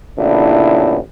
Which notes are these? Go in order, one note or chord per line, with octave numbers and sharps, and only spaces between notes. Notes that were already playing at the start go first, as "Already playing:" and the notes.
A1 A#2 C#3 B3 D4 E4